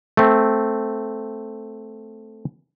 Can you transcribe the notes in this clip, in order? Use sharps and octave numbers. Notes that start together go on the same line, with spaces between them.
A3 C4